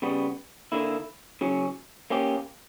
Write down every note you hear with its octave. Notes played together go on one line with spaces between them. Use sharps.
C#3 G3 B3
D3 A#3 E4
C#3 F#3 C#4
A#3 C#4 G4